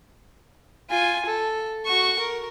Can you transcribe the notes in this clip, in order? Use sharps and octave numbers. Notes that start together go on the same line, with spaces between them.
F4 G#5
A4
F#4 C#6
A#4